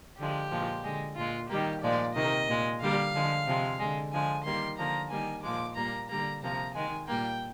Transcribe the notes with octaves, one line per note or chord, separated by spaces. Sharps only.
D3 F3 G#3 G4
A#2 F3 G#3
D3 G#3
A#2 G#3 F4
D#3 G3 A#3 G4
A#2 F3 G#3 D5
C3 D#3 A#3 D#5
A#2 G#3
D3 G3 A#3 F5
D3 F3 G#3
C3 F3 G#3
D3 G#3
D3 F3 G#3 G#5
D#3 G3 A#3 C6
D3 F3 A#3 A#5
D#3 G3 A#3 G#5
A#2 F3 G#3 D6
A#2 G3 A#3 A#5
D3 G3 A#3 A#5
C3 F3 A#3 A#5
D#3 G#3 G#5
A#2 G3 A#3 G5